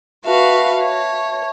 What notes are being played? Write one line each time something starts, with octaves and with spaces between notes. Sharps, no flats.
F#4 B4 E5 F5 A5 C#6
C#5